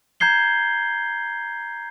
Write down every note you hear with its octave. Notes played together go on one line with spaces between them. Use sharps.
A#5 G6 G#6 C7 G7